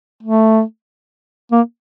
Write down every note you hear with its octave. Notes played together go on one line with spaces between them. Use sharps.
A3
A#3